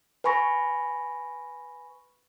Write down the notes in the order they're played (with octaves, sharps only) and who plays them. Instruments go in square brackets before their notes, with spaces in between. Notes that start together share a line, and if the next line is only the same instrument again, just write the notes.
[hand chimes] B4 G#5 B5 C#6 A#6